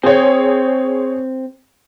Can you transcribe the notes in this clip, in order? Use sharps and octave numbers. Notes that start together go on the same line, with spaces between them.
C4 G#4 C5 C#5